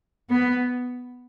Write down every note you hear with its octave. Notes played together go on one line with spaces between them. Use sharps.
B3